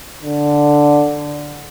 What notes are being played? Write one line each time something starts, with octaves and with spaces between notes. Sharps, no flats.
D3